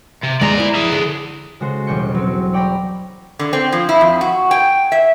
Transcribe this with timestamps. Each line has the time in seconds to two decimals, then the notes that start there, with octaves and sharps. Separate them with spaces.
0.24 C3
0.41 D#2 G#3 D5 D#5 A#5
0.58 E4 C5
0.75 G#4 E5
0.92 D3 D4
1.60 C#3 G#3 F#4 A4 C5
1.87 E1 B1 G3 C#4 G6 C#7
2.15 F#3 C4
2.53 C#5 D5 G5 A#5 B5
3.39 D3
3.53 C4
3.72 F3
3.89 E4
4.01 F2
4.21 F#4
4.51 G5
4.92 E5